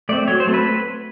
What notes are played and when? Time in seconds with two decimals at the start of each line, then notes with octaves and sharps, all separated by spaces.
0.09 A3 D5
0.12 C4
0.28 F#3 C#5
0.40 C5
0.47 A3 C4
0.54 B4